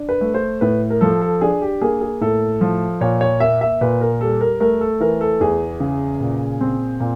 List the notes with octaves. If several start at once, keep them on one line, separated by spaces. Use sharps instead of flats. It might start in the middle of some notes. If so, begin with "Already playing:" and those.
Already playing: D4
B4
A3
C5
A2 B4
A#4
F3 A4
A4
D4 G#4
G4
A#3 G#4
G#4
A2 A4
F3
A#2 C#5
C#5
A#3 E5
E5
A#2 B4
A#4
G3 A4
A#4
A3 A#4
A4
E3 A#4
A4
E2 G#4
C#3
A#2
C4
A#2